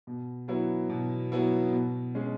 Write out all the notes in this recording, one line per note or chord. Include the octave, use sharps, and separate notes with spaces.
B2
F#3 B3 E4
B2
F#3 B3 E4
B2
G#3 C#4 G#4